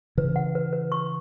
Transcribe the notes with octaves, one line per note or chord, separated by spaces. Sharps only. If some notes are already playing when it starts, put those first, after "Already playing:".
C#3 E3 B4
F#5
B4
B4
C#6